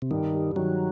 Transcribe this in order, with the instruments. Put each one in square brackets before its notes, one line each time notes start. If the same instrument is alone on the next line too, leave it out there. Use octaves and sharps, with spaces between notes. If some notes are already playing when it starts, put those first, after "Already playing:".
[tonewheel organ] C3
[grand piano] G2 [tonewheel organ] D#3
[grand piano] G3
[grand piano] D#3 [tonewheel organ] F#3